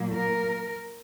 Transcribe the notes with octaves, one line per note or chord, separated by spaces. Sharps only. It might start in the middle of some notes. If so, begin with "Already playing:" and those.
Already playing: A#2 F#3 A#3
A#4